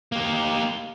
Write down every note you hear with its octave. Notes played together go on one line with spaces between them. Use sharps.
A#3 G4